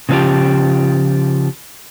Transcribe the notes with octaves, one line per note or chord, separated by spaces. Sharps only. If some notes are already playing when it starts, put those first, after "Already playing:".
C#3 F3 A#3 C#4 F4 G4